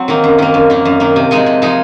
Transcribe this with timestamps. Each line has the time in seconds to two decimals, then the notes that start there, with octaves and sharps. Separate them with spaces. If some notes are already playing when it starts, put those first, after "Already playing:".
Already playing: F#3 C4
0.08 D#3 A#3
0.24 F#2
0.38 D#3 A#3
0.54 F#2
0.70 D#3 A#3
0.85 F#2
1.00 D#3 A#3
1.16 C3
1.31 F3 G#3 D#4 G#4
1.46 C3
1.62 F3 G#3 D#4 G#4